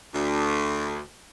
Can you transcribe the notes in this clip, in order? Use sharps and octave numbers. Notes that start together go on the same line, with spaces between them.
D2